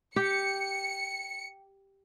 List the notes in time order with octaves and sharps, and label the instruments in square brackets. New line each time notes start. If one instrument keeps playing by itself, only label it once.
[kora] G4 [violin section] C#7